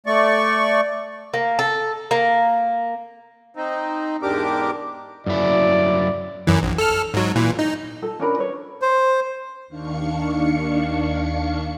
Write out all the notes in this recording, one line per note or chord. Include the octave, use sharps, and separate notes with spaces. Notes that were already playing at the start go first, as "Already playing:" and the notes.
A3 D5 C#6
A#3
A4
A#3
C4 D#4
E2 G#2 D4 G4 A#4 D6
F#2 E4 D5
F#2 E3
A#1
A4 F6
G#2 F#3
A#2 E3
D#4
A4
C#4 D4 A#4 B5
B4 C#5
C5
D#2 D#3 D4 F5 C#6 C#7